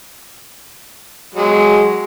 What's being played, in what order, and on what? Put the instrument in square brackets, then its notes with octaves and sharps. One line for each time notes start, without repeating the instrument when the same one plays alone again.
[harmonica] F#3 G#3